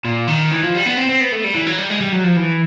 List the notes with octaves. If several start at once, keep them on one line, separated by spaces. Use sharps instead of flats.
A#2
D#3
E3
F3
G3
B3
C4
C4
B3
A3
G3
E3
F#3
G3
G#3
G3
F#3
F3
E3